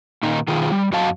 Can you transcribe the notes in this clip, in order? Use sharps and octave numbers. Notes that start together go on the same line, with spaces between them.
A#2 D#3 D#4
B2 D#3 F4 G#4
G3
F#2 F#3 F#4 D#5 F5 A5